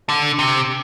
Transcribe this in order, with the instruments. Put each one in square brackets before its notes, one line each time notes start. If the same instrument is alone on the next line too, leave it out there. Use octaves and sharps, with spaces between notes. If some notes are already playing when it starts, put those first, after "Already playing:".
[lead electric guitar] D3
C3